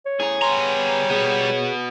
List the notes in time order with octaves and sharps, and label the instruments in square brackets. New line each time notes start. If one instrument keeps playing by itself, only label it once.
[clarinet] C#5
[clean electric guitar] A2 C#3 A#5 [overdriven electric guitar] G#4
[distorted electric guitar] G3 A#5 [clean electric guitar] B3 C6
[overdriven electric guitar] B3 F#4 [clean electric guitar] G#4